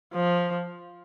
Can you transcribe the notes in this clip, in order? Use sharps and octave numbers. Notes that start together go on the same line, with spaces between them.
F3